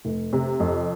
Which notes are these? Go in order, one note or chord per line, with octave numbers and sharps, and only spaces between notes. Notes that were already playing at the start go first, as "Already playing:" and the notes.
F1
C3
F2